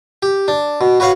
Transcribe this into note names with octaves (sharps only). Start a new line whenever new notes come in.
G4
D4
B2
F#4 B4 C#5 F5 F#5